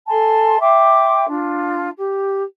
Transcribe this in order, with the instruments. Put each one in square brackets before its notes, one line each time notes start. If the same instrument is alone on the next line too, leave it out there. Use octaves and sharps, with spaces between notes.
[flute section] A4 G#5 A5 C6
E5 G5 C6 D6
D4 F4
G4